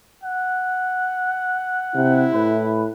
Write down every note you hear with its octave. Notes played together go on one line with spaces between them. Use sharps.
F#5
C3 E4
A2 B4